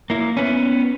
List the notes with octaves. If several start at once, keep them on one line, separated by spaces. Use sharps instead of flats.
A#3 E4
B3 C#4